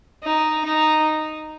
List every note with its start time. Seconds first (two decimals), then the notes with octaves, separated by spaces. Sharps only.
0.23 D#4
0.65 D#4